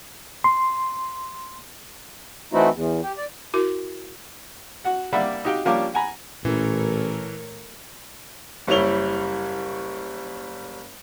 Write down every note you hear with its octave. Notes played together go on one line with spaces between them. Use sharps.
C6
E3 A3 C4 D#4 E4 F#4
E2
G4
D5
E4 F#4 A#4
F#4 F#5
G3 A#3 D5 E5 F#5 B5
D#4 F#4 G4 F5 G5
F3 G3 A#3 C#4 D4 G4
F#5 G#5 A#5 B5
A1 A#2 E3 A3 C#4 A#4 C#5
F#1 G3 E4 C#5 F7 G7